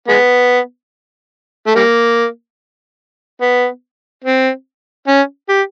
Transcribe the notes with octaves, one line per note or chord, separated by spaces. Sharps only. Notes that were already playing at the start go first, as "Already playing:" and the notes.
G#3 B3
A3
G3 A#3
B3
C4
C#4
G4